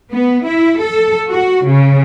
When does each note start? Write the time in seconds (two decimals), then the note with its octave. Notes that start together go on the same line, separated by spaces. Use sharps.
0.12 B3
0.46 E4
0.80 A4
1.29 F#4
1.65 C#3